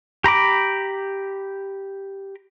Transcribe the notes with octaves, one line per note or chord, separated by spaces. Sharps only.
G4 A#5 B5 D6